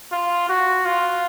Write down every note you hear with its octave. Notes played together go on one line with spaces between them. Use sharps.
F4
F#4
F4